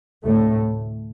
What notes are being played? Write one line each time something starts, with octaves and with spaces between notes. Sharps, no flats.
D2 A2 C3 A3